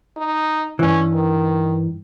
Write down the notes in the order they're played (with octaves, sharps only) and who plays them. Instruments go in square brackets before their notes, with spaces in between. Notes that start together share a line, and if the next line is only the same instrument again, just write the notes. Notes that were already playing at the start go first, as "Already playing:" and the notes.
[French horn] D#4
[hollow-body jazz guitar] G2 E3 [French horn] C#4
[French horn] D#3